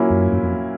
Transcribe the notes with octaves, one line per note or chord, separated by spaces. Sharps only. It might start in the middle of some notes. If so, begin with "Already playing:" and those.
Already playing: A#2 F#3 A#3 C#4 E4
F#2
F#2
F2